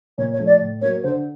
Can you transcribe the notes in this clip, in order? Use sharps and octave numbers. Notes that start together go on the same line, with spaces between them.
A#2 C#5
C#5
F3 A3
D5
A2
F#3 A#3 C#5
D3 C5